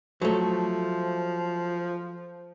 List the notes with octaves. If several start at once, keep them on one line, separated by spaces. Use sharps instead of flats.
F3 F#3 A3